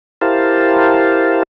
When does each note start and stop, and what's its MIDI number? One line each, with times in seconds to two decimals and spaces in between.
0.21 1.43 64
0.21 1.43 67
0.21 1.43 70
0.21 1.43 72
0.21 1.43 77
0.21 1.43 81